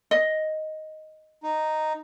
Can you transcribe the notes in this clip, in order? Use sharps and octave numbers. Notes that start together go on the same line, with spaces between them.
D#5
D#4